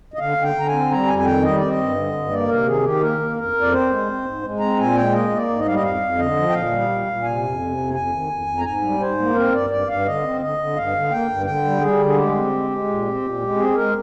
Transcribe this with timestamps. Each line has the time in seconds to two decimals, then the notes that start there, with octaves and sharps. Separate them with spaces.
0.14 D#5
0.19 D3 F5
0.37 D3
0.42 G5
0.55 D3
0.60 A#5
0.67 G#5
0.72 C4
0.91 G3 A#5
1.07 F2 G#5
1.18 G#5
1.25 D#3 G5
1.43 G3 D#5
1.56 C4 D5
1.69 D#5
1.77 G2
1.96 D3
2.13 G2
2.30 A#3 D5
2.48 C3 A#4
2.66 D#3 G#4
2.83 D#3 G4
3.01 A#3 A#4
3.19 A#3
3.36 F2 A#4
3.53 F2
3.61 D5
3.72 C4 C5
3.89 G#3
4.06 C4
4.25 G#2
4.43 G#3
4.59 C4 A#5
4.77 A#2 G#5
4.94 G#3 G5
5.12 A#3 D#5
5.30 A#3
5.35 D5
5.48 G#2
5.59 D#5
5.65 G3 F5
5.74 D#5
5.83 F2 F5
6.01 F2
6.18 D3 D#5
6.35 F3
6.49 G5
6.53 A#2 F5
6.70 G3
6.89 A#2
7.07 A#2
7.23 C3 G#5
7.41 F2
7.59 C3
7.77 F2
7.94 F2 G#5
8.12 D#3
8.30 F2
8.47 F2
8.58 A#5
8.65 G#2 G#5
8.82 G3
8.99 G#2 C5
9.18 A#3
9.35 C4 A#4
9.52 G2 D5
9.70 G2 D5
9.87 G2 F5
10.05 D3 D#5
10.23 C4
10.40 D3 D#5
10.58 D3
10.76 G2 F5
10.94 D3
11.11 A#3 G5
11.29 G2
11.46 D3 G5
11.65 G3
11.81 G3 G#4
11.99 D3
12.05 G#4
12.16 G#3 G4
12.35 C4
12.53 G#3
12.70 G#3
12.87 A#2
13.05 C4
13.22 A#2
13.41 G#3
13.57 C4 G#4
13.75 G#3 A#4